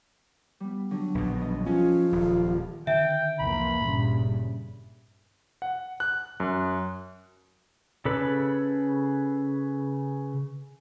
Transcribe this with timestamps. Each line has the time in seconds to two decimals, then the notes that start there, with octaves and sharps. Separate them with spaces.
0.60 G3 B3
0.91 D3 F#3 D4
1.15 A#1 B2 B3
1.39 F#3 G3 D#5
1.66 F3 C#4 F4 G#4 A4 A5
2.12 D#1
2.87 D3 D#3 E5 G5
3.39 C2 F2 E3 A#3 B5
3.82 G1 G2 A#2 C#3
5.62 F#5
6.00 F#6
6.40 F#2
8.05 C#3 A4 B4 B5